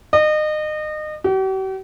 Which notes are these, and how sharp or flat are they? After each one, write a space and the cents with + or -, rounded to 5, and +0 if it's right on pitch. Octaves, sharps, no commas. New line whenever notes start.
D#5 -30
G4 -45